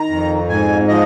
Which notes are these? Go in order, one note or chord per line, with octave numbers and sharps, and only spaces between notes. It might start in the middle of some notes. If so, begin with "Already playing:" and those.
Already playing: D#3 A#5
F2
G#2 G#5
F3 D#5